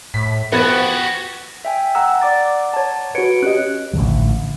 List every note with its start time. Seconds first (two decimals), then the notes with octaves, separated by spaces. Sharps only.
0.14 A2 B6
0.52 F3 B3 F#4 G4 F#5 G#6 A6
1.65 E5 G5 G#5
1.95 F#5 A#5 E6
2.22 D5 D6 A6
2.74 C#5 A5
3.15 F#4 B4 C#5 C#7 D7
3.43 C#4 G4 D#5 F#6
3.93 A1 A#2 D3 F3